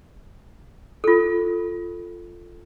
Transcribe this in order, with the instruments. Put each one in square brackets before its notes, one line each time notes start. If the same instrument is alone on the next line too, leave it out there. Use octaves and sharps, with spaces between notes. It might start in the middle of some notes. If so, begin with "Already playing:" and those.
[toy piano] F4 A4